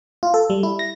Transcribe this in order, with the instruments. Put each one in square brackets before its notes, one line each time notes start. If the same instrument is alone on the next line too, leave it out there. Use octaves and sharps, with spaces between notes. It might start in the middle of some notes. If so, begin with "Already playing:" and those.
[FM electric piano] F4
A4
G3
E4
A#6